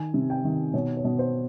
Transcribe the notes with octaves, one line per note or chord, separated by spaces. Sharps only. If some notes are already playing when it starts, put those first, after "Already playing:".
Already playing: D#3 G#5
C3
G5
D#3
B2 C#5
C#5
B2
C5